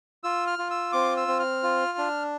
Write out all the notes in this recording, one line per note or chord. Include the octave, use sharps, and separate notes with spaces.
F4 E6
F6
F4
E6
C4 D6
E6
C4
F6
F4
D4